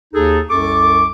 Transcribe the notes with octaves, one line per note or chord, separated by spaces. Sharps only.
D#2 D#4 G#4 A4
C2 F#2 A4 C#6 D6